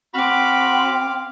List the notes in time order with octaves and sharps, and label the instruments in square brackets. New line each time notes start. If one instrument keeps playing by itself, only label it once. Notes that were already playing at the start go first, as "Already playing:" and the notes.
[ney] C4 [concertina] F#4 B5 [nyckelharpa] F5 D6